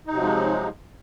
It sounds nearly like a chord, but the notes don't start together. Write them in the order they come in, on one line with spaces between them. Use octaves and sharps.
D#4 C3 F#3 F3 G#3